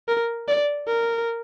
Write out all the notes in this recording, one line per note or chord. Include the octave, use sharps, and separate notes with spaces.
A#4
D5
A#4